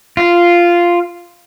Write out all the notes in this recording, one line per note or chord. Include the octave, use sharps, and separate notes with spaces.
F4